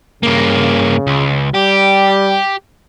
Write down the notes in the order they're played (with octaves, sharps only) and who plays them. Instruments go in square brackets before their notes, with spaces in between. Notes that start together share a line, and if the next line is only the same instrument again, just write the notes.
[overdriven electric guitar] G2 A#3 [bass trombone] C#3
[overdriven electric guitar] C#2
[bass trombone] G3 [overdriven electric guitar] G4